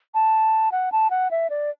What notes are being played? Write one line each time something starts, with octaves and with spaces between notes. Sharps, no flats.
A5
F#5
A5
F#5
E5
D5